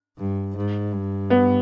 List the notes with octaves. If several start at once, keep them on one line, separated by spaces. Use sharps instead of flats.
G2
G#2
G2
B3